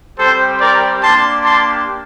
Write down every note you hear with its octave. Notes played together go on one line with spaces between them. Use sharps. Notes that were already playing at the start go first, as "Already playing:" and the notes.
G3 C4 G4 A4 C5
A#4 D5
A#3 D4 G4 A5 C6
A5 C6